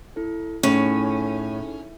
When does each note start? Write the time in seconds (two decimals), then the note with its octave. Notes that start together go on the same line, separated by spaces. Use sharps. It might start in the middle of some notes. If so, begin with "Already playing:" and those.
0.16 E4 A4
0.63 A2 C#4 D#4 G#4 A4